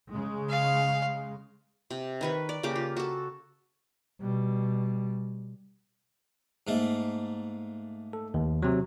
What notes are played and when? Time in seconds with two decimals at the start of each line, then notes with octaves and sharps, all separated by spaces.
0.12 C#3 G#3
0.50 F5
1.90 C3
2.21 D#3 B4 C#6
2.49 D5
2.63 C#3 A#3 G4 D6
2.76 F4
2.97 F#4 A4
4.21 B2 G3
6.67 G#2 A3 A#3
8.13 A4
8.34 D#2
8.62 C3 F#3